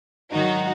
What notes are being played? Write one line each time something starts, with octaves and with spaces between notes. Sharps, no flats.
G#2 D#3 F#3 D#4 F#4